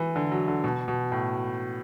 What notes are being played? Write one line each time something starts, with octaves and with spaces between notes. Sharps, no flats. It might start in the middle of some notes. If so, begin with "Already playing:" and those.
Already playing: E3
D3
F#3
D3
B2
B2
A2